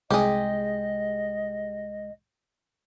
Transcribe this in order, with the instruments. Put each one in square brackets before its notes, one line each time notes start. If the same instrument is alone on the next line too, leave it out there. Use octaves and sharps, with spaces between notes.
[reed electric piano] C2 G#3 [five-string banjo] G4 G#4 [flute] D#5